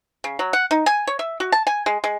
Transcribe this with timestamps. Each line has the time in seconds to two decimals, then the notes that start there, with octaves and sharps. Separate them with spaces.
0.24 C#3
0.39 F#3
0.53 F#5
0.71 D#4
0.86 G#5
1.07 C#5
1.19 E5
1.40 F#4
1.52 A5
1.67 G#5
1.86 G#3
2.04 G#3